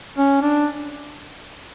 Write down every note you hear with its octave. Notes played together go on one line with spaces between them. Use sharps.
C#4
D4